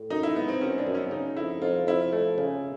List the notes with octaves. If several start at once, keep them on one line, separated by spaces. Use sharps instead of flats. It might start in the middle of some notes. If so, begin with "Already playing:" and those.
Already playing: A2
F#2 D#4
E4
G#3 B3
C4
F#2 C#4
D4
F#2
C#4
C#3 D#4
F2 E4
F2 F4
F2 E4
A3
C#3